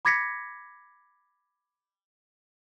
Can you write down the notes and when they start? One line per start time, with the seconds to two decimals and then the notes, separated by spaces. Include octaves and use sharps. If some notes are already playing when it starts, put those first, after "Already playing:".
0.05 B5 D6 G#6 A#6 B6 C#7